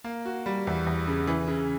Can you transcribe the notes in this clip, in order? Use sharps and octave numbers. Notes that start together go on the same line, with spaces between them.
A#3
F#4
G3
E2
E2
C#3
E3
C#3